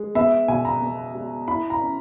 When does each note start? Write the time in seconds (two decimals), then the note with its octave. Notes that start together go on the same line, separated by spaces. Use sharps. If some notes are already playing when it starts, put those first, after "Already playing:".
Already playing: G#3
0.15 B3 E5
0.48 B2 G#5
0.65 A#5
0.82 B3
1.15 G#3
1.48 E4 B5
1.70 A#5
1.81 C#4